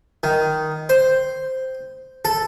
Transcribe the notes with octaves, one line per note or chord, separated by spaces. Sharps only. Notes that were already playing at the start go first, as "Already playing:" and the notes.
D#3
C5
A4